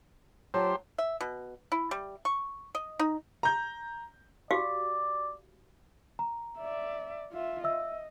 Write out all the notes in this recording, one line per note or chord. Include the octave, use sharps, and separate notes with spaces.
F#3 F4 G4 C5 A5
E5
B2
E4
G3
C#6
D#5
D#4
A#5 G6
F#4 G4 D5 F5
A#5
D5 E5
F4 E5
D#5 E5 E6